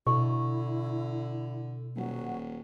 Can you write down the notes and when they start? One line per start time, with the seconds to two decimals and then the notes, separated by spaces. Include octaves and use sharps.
0.07 B2 D3 E4 C#6
1.96 D#1 F#3